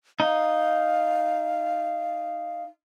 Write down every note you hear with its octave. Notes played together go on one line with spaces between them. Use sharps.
D#4 F5